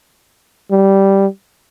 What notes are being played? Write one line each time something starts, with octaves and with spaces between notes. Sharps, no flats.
G3